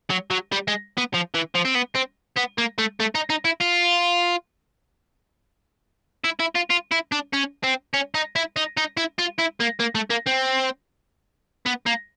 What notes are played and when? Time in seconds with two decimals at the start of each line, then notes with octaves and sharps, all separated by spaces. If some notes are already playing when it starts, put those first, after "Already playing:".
0.10 F#3
0.31 F#3
0.52 G3
0.68 G#3
0.98 B3
1.14 F3
1.35 E3
1.55 F3
1.65 C4
1.75 B3
1.95 C4
2.37 B3
2.58 A#3
2.78 A3
3.00 A3
3.15 D#4
3.30 D#4
3.45 E4
3.61 F4
6.25 E4
6.40 E4
6.55 F4
6.70 F4
6.92 E4
7.12 D4
7.33 C#4
7.64 C4
7.94 C#4
8.15 D#4
8.36 E4
8.56 D#4
8.77 D#4
8.97 E4
9.18 F4
9.38 E4
9.60 A#3
9.80 A#3
9.95 A3
10.10 A#3
10.27 C4
11.66 B3
11.86 A#3